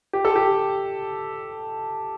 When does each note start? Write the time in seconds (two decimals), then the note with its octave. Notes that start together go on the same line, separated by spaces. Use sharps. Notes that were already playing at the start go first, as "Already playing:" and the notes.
0.13 G4
0.25 A4
0.36 G4